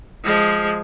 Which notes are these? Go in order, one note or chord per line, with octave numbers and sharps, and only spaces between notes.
F3 G#3